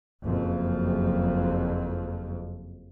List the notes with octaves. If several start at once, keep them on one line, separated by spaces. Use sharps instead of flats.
F#1 F2